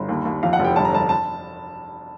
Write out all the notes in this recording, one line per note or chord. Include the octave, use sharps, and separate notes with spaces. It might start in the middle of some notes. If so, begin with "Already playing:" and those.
Already playing: G1
D#2
D#2
F2 F5
F#5
F1
G5
G1 A5
A#5
G1 A5
A5